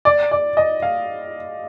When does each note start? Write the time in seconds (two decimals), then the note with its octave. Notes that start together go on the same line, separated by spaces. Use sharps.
0.05 D5
0.31 D5
0.57 D#5
0.82 F5